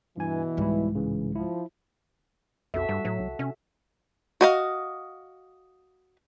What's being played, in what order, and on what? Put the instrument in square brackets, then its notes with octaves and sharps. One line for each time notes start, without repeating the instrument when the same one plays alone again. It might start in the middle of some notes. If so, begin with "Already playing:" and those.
[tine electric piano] G2 G#5 [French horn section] B2 E3
[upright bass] C2 G#2 [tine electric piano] G3 E4
[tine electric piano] A2 C#3 E3
[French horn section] F3 [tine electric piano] E4
[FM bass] B1 [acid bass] F2 [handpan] F#4 A4 E5
[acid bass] G2 [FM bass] G3
[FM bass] A2 [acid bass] F#3
[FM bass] C2
[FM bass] C3 [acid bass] C#4
[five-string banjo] F#4 D#5 F5